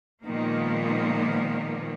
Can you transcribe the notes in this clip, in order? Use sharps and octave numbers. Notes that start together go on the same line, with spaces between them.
A#2 D#3 F3 G#3 A#3 B3